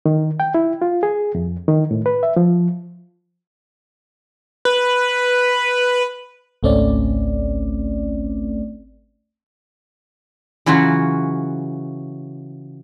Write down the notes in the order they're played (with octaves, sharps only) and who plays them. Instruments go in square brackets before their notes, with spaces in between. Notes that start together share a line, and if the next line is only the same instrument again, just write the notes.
[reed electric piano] D#3
G5
E4
F4
G#4
F2
D#3
A2
B4
E5
F3
[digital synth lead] B4
[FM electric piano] G#1 C#2 A3 C4 C#4 D5
[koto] C#3 E3 F#3 F4 F#4